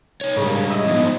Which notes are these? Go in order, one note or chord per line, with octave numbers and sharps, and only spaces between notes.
D#4 C#5
G#2 C#3 G3 A#3
E4 D#5
F3 B3 D#4
C5